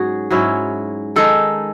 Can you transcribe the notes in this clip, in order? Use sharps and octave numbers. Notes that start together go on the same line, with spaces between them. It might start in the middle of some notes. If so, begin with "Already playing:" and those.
Already playing: G#2 F#3 C#4 F#4 G#4
G#2 F#3 C#4 E4
D#3 G#3 D#4 A4